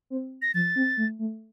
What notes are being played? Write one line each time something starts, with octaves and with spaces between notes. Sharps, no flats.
C4
A#6
F3 A6
C4
A3
A3